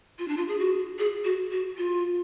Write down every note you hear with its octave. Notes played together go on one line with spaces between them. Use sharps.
F4
D4
F4
G#4
F#4
G#4
F#4
F#4
F4